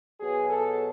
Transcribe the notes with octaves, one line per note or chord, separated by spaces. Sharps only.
B2 F#3 G#4
A4